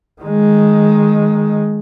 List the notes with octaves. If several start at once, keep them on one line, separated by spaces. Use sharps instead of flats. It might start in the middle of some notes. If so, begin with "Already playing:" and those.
D#3 G#3